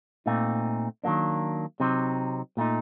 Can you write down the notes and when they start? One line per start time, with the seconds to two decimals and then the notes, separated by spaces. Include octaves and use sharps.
0.26 A#2 A3 C4 D#4
1.04 D#3 F#3 A#3 D4
1.80 C3 F#3 C4 D#4
2.57 A#2 A3 D#4